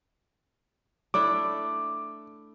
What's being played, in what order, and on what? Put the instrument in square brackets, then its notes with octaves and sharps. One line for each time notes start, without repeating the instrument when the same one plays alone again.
[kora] A3 D4 E4 [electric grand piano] D6